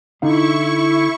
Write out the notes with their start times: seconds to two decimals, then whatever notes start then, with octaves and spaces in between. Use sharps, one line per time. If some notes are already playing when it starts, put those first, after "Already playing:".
0.22 D3 D#4 E4 F5 C#6